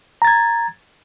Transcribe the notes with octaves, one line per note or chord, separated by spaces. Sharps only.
A#5 G#6 A6